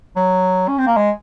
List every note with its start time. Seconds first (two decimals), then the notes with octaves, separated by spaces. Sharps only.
0.16 F#3
0.68 C#4
0.78 C4
0.87 A#3
0.96 G#3